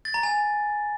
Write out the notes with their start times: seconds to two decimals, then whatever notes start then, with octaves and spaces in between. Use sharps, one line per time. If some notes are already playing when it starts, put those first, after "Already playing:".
0.05 A6
0.14 A#5
0.23 G#5